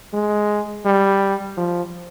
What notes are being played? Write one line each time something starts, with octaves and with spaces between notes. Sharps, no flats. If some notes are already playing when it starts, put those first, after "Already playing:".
G#3
G3
F3